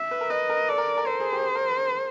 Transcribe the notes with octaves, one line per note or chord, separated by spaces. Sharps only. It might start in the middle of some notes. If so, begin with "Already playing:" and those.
Already playing: E5
B4
A#4
B4 D#5
A#4
A4 D5
A#4
A#4
A4 C5
G#4
G4
G#4
A#4